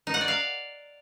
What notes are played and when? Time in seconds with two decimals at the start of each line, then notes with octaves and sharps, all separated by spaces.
0.07 D#4
0.14 F#5
0.21 D5
0.28 F5